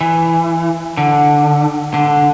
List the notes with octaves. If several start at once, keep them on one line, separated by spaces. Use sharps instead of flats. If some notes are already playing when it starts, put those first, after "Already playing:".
E3
D3
D3